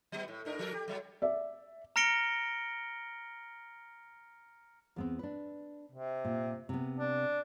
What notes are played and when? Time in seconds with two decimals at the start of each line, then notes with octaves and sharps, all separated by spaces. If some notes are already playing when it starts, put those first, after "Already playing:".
0.12 F#3 B3
0.28 A2
0.45 A2 D4 A#4
0.59 F3 A4 A#4
0.73 G4
0.88 F#3 G3
1.22 D5 E5
1.96 A#5 F6 A#6 C#7 D7 G7
4.96 E2 B3 C4
5.19 D4 B4
5.92 C3
6.25 A#2
6.69 C3 B3
6.98 D4